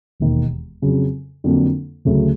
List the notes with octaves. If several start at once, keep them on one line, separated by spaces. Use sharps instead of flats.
E1 D#2 D#3
F2 C#3 F#3
F2 D3 F#3 A#3 D4
D2 C#3 F#3 A3